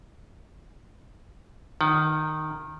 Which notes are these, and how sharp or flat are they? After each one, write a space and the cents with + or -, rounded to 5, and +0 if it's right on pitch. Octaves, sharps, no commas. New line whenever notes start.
D#3 -10 F#5 +35